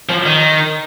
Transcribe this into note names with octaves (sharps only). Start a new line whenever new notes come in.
F3
D#3